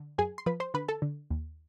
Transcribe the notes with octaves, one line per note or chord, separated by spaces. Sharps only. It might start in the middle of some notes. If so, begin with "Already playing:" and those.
Already playing: D3
F#2 G#4 G#5
C6
F3 B4 B5
C5 C6
D3 B4 B5
A4 A5
D3
D#2